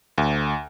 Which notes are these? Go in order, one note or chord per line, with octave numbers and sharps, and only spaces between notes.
D2